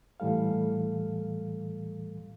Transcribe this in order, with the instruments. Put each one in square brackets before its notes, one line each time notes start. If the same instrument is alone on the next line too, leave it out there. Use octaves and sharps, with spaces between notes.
[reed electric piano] A2 E3 G3 A4 F5